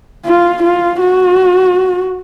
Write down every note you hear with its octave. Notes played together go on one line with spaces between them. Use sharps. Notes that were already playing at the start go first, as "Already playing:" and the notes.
F4
F4
F#4